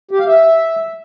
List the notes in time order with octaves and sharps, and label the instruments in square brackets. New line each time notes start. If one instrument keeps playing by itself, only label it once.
[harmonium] G4
F5
E5